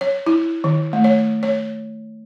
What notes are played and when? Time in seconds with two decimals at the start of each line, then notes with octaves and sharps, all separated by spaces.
0.01 C#5
0.26 E4
0.64 D#3
0.93 A3
1.04 C#5
1.43 C#5